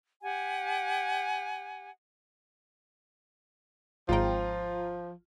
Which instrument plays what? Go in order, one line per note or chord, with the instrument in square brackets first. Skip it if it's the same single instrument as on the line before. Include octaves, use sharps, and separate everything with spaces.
[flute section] G4 F#5 G#5
[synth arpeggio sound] G#1 G#2 G5 [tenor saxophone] F3 [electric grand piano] F4 A#5